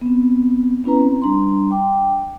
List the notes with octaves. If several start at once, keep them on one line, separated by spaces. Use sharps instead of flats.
B3 C4
B3 C#4 E4 B4 A#5
C4
G3 D4 A#5 C6
G5 D6